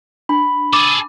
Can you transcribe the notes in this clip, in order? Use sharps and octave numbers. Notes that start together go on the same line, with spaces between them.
D4 B5
G#4 A4 D6